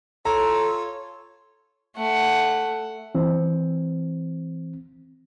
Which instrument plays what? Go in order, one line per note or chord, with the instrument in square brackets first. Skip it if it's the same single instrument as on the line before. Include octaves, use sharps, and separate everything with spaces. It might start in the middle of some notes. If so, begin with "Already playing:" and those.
[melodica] F4 C#5 [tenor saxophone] A4 [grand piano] A#5
[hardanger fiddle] A3 F#5
[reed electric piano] E3 C4